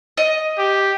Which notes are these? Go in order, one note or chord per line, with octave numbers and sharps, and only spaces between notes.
D#5
G4